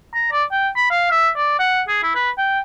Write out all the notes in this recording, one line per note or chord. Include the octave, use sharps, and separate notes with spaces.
A#5
D5
G5
B5
F5
E5
D5
F#5
G#4
E4
B4
G5